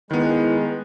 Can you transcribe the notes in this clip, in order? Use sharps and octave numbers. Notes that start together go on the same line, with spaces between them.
D#3 G#3 B3 E4 B4